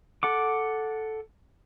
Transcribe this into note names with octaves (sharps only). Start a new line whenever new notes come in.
A4 F#5 D6